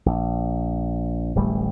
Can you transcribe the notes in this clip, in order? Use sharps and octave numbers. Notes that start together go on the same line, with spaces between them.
A#1
D1 A1 G3 A3